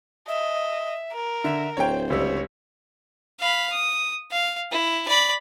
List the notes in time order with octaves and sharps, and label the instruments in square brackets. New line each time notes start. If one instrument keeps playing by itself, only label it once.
[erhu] D#5 [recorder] E5
[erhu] A#4
[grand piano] D3 [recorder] E5
[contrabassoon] D1 [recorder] C5 [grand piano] C#5 G5
[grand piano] C#2 G3 E6 [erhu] C#5
[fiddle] F5 B5
D#6
F5
E4
D5 B5